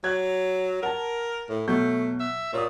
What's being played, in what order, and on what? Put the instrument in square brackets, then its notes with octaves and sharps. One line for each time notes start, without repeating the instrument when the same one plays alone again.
[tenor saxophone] F#3 [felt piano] F#6 G#6
[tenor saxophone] A#4 [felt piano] F#5 A5
[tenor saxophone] A2
[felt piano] B2 F#3 G6 [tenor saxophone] A3
[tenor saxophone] E5
[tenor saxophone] A#2 [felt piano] C#5 D#6